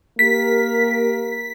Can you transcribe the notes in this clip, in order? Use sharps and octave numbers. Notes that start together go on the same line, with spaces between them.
A#3 G4 A#4 B6